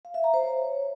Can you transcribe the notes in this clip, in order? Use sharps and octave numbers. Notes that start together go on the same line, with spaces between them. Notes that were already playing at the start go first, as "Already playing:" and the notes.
F5
E5
A#5
C5
C#5